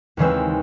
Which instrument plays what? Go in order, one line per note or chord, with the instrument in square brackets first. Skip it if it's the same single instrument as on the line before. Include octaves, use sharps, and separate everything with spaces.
[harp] D#2 C#3 E3 G#3 C4 E6